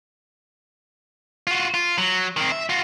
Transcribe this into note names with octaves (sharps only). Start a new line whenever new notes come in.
F4 F#4
F4
F#3
D#3 C4
E5
F4 F#4